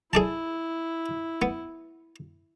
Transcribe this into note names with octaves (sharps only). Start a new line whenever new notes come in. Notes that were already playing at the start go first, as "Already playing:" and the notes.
E4 G#4 D5 A5
B3